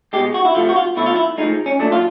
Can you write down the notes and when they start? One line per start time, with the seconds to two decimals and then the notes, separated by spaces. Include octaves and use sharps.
0.13 B2 G#3 G4
0.34 F#4
0.45 E4
0.55 C3 F3 A3 F4
0.69 F#4
0.76 F4
0.96 B2 F#3 A3 E4
1.06 F4
1.16 E4
1.38 A2 F3 G#3 D#4
1.66 C#4
1.79 A#2 F#3 A3 D4
1.92 F4